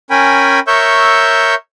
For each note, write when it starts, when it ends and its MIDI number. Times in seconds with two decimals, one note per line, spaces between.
0.10 0.59 61
0.10 0.59 70
0.10 0.59 79
0.10 0.59 80
0.10 0.59 83
0.67 1.55 70
0.67 1.55 73
0.67 1.55 76
0.67 1.55 85
0.67 1.55 88
0.67 1.55 91